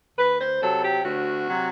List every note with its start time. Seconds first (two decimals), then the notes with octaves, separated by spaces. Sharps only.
0.18 D2 B4
0.41 C5
0.62 C3 F#3 A4
0.84 G4
1.05 D2 F#4
1.49 C3 F#3